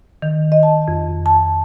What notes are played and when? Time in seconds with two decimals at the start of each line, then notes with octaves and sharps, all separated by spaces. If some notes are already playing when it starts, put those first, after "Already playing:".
0.22 D#3
0.52 D#5
0.63 A5
0.88 F2
1.26 A5